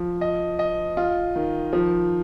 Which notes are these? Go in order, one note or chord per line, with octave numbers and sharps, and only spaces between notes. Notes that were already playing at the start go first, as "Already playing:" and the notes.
Already playing: F3
D#5
D#5
F4
D#3
F3